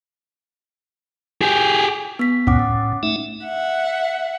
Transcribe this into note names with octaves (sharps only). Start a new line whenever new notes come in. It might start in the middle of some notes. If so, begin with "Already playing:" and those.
G4 G#4
B3 B6
C#2 F#2 A#2 C#4 F#5 D6
A2
A3 D#4 E5
E5 F#5